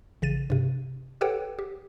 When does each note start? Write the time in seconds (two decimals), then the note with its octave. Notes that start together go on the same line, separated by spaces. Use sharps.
0.22 A1 C#3 A6 D#7
0.50 G2 C3
1.21 G4 A4 B4 C#5 F#5 G5
1.59 G4